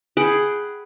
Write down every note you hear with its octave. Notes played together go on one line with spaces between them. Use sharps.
G#4 F#5 G5 B5